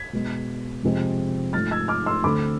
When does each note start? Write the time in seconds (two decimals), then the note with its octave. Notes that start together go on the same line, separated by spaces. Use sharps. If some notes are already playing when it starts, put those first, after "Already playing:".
Already playing: G#6 B6
0.13 B2 G#3 B3
0.83 F2 C3 G#3 C4
1.53 G#2 F3 A3 F6 A6
1.71 E6 G#6
1.88 D6 F6
2.06 C6 E6
2.24 D2 D3 A3 C4 B5 D6